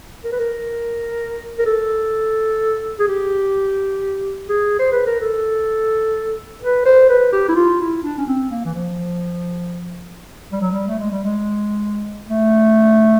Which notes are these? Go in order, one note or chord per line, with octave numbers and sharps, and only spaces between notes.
A#4
B4
A#4
A#4
A4
G#4
G4
G#4
C5
B4
A#4
A4
B4
C5
B4
G4
E4
F4
E4
D4
C#4
C4
A#3
E3
F3
G3
F#3
G3
A3
G#3
G3
G#3
A3